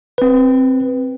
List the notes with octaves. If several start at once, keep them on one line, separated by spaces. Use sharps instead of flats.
C4 B4